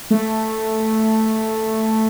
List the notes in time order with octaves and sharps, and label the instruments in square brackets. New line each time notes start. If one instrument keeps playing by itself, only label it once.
[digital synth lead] A3